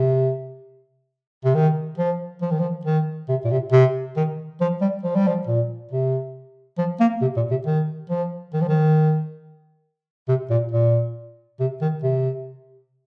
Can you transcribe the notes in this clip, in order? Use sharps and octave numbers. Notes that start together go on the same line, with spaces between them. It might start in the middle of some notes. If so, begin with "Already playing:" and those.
Already playing: C3
C3
D#3
F3
F3
D#3
F3
D#3
C3
A#2
C3
C3
D#3
F3
G3
F3
G3
F3
A#2
C3
F3
A#3
C3
A#2
C3
D#3
F3
D#3
F3
D#3
C3
A#2
A#2
C3
D#3
C3